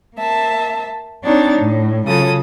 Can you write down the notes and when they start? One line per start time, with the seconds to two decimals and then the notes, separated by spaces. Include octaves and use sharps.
0.18 A#3 E5 A5
1.24 C4 D4 D#4 C#5 A6
1.58 A2
2.06 C#3 F#3 F4 A4 D#6